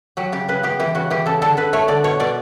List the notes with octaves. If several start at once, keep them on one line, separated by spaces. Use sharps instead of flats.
F#3 G4
C#3 G4
C#3 B4
B3 G4
E3 G4
C#3 F#4
E3 G4
C#3 A4
D3 A4
D3 B4
A3 C#5
D3 D5
B2 C#5
B2 D5